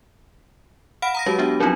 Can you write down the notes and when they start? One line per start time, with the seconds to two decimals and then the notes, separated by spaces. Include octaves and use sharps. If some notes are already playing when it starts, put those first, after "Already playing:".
1.02 F5 F#5 B5 F6 D7
1.15 A#5 D#6 A#6
1.26 F#3 G#3 C#4 F#4 G4
1.39 B3 D4 F#4 G4
1.60 F3 F#3 C4 D4 D#4 F4